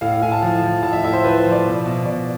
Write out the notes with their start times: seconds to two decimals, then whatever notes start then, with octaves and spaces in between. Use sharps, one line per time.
0.01 A2 F5
0.12 F5
0.22 A2 G#5
0.32 A5
0.42 F3
0.63 F3
0.83 A2 A5
0.93 E5
1.04 A2 E5
1.13 C5
1.24 F3 B4
1.37 C5
1.45 F3
1.52 D5
1.65 B2
1.86 B2
2.05 B2 D5